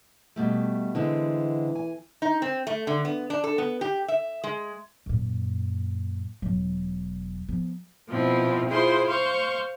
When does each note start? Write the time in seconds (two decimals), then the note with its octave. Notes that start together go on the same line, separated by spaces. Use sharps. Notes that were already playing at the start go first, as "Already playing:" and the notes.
0.36 B2 G3 A3
0.95 D3 E3 G#3 C4
1.75 G#5
2.22 D#4
2.42 C4
2.67 A3
2.87 D3
3.05 B3
3.30 D4
3.44 A4
3.58 B3
3.81 G4
4.08 E5
4.44 G#3
5.06 F#2 A#2
6.42 E1 F#3
7.49 F3 B3
8.09 B2 F3 C4 E4 F4
8.67 E4 F4 G#4 C5 C6
9.07 C5 F5 C6 C#6